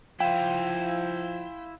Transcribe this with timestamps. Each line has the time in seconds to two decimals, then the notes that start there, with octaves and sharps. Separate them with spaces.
0.20 F3 E4 C5 F5 G5